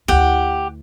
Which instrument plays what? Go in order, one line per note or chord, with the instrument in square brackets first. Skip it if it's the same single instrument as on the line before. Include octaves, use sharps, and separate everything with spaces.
[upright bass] D2 E4 [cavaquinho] G4 F#5